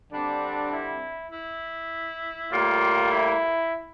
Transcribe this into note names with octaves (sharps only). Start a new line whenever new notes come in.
D3 G3 C4 D4
E4
E4
A2 G3 A#3 F4
E4